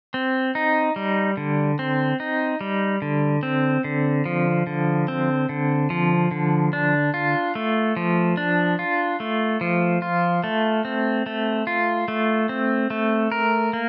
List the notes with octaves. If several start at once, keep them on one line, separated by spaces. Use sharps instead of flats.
C4
D#4
G3
D3
C4
D#4
G3
D3
C4
D3
F3
D3
C4
D3
F3
D3
D4
F4
A3
F3
D4
F4
A3
F3
F4
A3
C4
A3
F4
A3
C4
A3
A#4
A#3